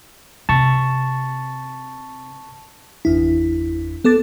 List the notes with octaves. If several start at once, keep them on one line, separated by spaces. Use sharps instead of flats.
C3 A5 C#6
G1 E2 E4
B3 A4 D6 A6